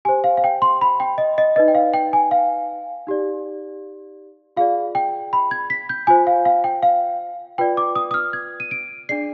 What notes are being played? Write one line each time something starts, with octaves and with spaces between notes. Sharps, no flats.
G4 C5 G#5
F5
F5
G5
C6
B5
G5
D#5
D#5
D#4 B4 D5 D#5
G5
F5
G5
G#5
F5
D#4 G4 D5
F4 G#4 D5 F5
G5
B5
G#6
B6
G6
F4 C5 G#5
F5
F5
G5
F5
F4 B4 D5 G5
D6
D#6
D#6
F6
G#6
D#7
D7
D4 G#4 D5 C7